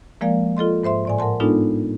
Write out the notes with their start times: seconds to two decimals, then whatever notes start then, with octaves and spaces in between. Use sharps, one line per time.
0.21 F3 G#3 A#3 A#4 D5 F5
0.57 F4 A4 D#5 C6
0.83 G#2 C5 E5 C6
1.05 A2 D5 G#5
1.19 A#4 F#5 A5 C6
1.40 G#3 B3 D4 D#4 F4 A4